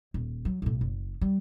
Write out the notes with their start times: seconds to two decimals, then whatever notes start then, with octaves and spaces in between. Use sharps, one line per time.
0.14 D#1
0.45 F#3
0.62 B1 A2
0.81 F#1
1.21 G3